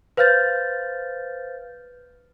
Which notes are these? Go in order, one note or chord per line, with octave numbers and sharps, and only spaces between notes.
B4 C5 F5 F6 G6 A6